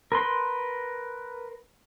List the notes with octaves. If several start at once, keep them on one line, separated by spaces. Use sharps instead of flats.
A#4 B4 C6